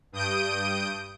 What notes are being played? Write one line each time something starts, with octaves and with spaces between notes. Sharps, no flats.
G2 D#6 G6 D7 D#7